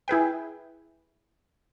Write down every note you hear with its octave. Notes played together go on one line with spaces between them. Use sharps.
E4 G#4 B4 G5